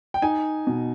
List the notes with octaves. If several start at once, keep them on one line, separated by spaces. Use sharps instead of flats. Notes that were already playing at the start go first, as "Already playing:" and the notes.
G5
D#4 G#5
B2